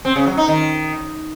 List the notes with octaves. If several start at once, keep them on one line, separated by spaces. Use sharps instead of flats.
C4
C#3
F#3
D#4
D#3